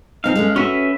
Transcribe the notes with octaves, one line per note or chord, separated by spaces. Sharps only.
F3 C4 D#4 F5
G#3 A3 C#4
C#4 F#4 B4 E5